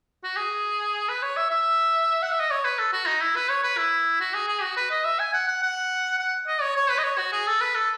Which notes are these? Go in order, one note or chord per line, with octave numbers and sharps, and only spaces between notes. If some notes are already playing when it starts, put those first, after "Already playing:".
F#4
G#4
B4
C#5
E5
E5
F#5
E5
D#5
C#5
B4
A4
F#4
D#4
E4
B4
C#5
B4
E4
F#4
G#4
G#4
F#4
B4
D#5
E5
G#5
F#5
F#5
F#5
F#5
D#5
C#5
C#5
B4
D#5
C#5
F#4
G#4
A4
B4
A4